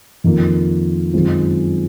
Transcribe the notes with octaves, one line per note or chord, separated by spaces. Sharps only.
F2 D#3 A#3 F4
F#2 D#3 G#3 C4 F4